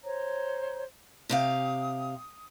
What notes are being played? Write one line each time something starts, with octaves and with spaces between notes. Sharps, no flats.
C5 C#5 A#5
C3 G4 F5 D#6